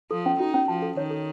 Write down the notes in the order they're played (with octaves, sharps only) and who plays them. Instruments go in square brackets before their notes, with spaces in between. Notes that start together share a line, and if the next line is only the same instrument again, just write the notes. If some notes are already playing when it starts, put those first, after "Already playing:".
[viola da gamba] F3 [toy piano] A4
[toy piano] C#4
[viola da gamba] D#4 [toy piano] F#4
[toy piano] C#4
[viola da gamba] F3 [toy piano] A5
[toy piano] A4
[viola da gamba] D#3 [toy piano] C#5
[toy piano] A4